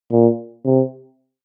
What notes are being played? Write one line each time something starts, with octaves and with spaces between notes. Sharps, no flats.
A#2
C3